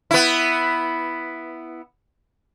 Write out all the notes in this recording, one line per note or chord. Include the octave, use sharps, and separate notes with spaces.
B3 E4